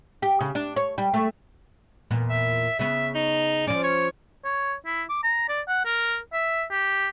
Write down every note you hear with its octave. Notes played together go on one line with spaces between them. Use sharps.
G4
C#3
D4
C#5
G3
A3
E2 A#2 B3
E5
C#3 B3 E5
D#4
F3 C#4 D5
C#5
C#5
E4
D6
A#5
D5
F#5
A#4
E5
G4